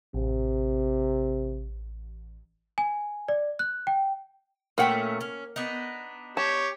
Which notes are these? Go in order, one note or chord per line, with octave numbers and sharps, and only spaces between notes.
A1 C3
G#5
D5
F#6
G5
A#2 A3 A#3 C#4 F#5 G5
C#4
B3 D4 D#4
G4 C#5 A5